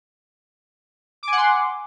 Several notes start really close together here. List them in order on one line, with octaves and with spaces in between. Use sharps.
D6 G#5 F#5 C6